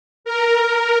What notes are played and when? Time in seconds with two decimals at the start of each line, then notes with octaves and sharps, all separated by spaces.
0.25 A#4